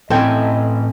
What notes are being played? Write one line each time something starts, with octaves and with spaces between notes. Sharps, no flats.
A2 C4 C#4 E4 A4 D#5 G5 G#5